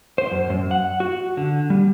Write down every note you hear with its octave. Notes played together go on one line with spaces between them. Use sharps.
C5
F#2
F#2
F#5
F#4
D3
G3